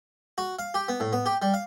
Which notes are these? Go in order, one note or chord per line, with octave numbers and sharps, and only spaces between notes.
F#4
F5
G4
B3
A2
B3
G4
G3
F5